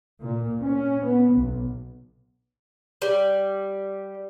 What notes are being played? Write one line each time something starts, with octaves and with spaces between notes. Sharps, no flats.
A#2
C#4
B3
B1
G3